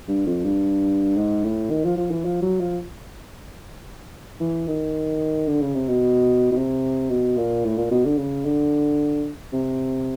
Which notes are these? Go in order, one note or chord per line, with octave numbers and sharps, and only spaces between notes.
G2
F2
G2
G#2
A2
D#3
F3
F3
E3
F3
F#3
F3
E3
D#3
D3
C#3
C3
B2
B2
C3
B2
A#2
A2
A#2
B2
D3
C#3
D3
C3